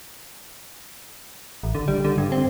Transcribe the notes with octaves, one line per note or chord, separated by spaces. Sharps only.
A1
D3
G3
D3
G2
C4